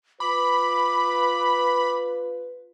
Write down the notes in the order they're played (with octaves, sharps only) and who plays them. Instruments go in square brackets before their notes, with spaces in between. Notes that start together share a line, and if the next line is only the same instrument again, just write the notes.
[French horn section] F4 B4 [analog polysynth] B5 [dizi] D6